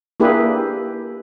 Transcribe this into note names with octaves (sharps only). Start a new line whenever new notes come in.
A#3 D4 E4 G4 G#4 B4